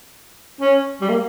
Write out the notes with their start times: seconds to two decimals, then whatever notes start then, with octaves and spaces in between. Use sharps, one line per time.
0.61 C#4
1.01 G3
1.09 A#3